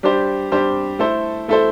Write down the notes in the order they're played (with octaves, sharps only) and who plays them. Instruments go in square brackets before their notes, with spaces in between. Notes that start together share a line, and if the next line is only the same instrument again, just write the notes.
[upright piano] G3 D4 G4 C5
G3 D4 G4 C5
A3 E4 A4 C5
A3 E4 A4 C5